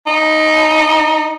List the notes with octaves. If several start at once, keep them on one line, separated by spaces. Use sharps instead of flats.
D#4